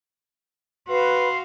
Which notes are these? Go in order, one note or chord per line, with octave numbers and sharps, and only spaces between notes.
F#4 B4 F5 C6